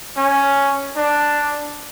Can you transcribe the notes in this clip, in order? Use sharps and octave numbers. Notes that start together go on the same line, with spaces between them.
C#4
D4